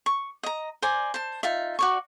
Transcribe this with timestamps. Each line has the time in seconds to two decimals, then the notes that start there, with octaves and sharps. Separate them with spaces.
0.06 C#6
0.43 D#5 A#5
0.82 C5 D5 G#5 A#5
1.14 C5 A5
1.43 D#4 F4 E5
1.79 F#4 D5 C#6